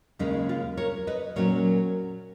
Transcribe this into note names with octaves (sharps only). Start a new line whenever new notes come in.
D#2 C#3 G#3 C#4 D#4
F4
A#4 C#5
B4 D#5
A#2 F#3 C#4 A#4 C#5